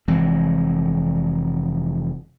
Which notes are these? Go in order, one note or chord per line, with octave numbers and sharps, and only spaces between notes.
F1 E3 G#3 C4